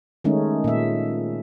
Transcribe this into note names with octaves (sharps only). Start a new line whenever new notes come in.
D#3 G#3 A3 C#4 D#4
A#2 E5